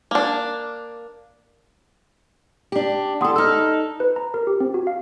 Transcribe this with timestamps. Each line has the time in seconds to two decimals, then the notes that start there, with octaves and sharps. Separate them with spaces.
0.11 A#3 D4
2.72 D4 G4
3.21 E2 A4 F#5 C6 D#6
3.36 D#4 A4 E6 F6
4.00 B4
4.16 A#5
4.34 A#4
4.47 G4
4.60 C4
4.74 F#4
4.87 F5